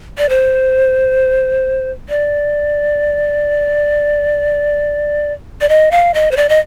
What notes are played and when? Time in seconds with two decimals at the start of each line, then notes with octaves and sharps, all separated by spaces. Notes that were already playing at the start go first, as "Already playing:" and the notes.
0.18 D5
0.29 C5
2.09 D5
5.61 D5
5.69 D#5
5.91 F5
6.14 D#5
6.31 C5
6.37 D5
6.49 D#5